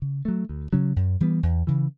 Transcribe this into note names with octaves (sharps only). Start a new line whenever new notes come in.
C#3
F#3 A3
D2
C#3 F#3 C#4
F#2
E3 G3 B3
E2
C#3 E3